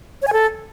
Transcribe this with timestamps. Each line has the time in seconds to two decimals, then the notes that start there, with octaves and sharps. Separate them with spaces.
0.22 C#5
0.27 G#5
0.33 A4